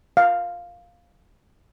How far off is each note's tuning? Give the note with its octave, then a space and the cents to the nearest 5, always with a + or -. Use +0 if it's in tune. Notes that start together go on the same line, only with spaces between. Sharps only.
F5 +5